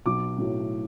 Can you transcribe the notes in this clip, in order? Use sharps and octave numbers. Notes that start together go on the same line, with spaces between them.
B1 D6
A2 F#3